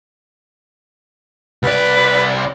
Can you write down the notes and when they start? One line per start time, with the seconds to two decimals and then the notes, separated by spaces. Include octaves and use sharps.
1.63 C2 B4 D5